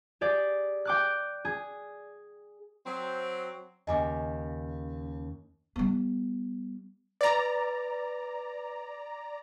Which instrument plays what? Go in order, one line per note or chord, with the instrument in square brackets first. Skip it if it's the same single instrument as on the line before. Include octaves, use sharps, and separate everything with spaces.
[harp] G4 G#4 D5
G5 D6 F#6
G#4
[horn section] F#3 C4
[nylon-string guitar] D#2 C#3 [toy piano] D#5 G#5 D6
[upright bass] G3 B3
[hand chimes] B4 A6 [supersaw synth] D5 A#5